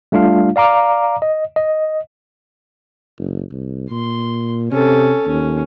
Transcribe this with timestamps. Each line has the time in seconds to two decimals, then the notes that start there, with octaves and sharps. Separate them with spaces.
0.12 G3 A3 D4 F4 F5
0.56 D5 F5 A#5 D6
1.22 D#5
1.56 D#5
3.18 F#1
3.52 C2
3.91 A#2 C6
4.72 C3 C#4 A4
5.27 D#2 C#4